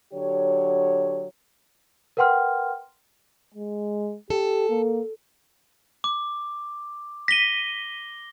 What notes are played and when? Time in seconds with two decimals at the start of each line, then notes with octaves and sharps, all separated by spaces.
0.13 D3 F#3 G4 C#5
2.17 A#4 B4 F#5 G5 C6 F6
3.54 G#3
4.30 G4 A4
4.69 A#3
6.04 D6
7.28 A#6 B6 D#7 G7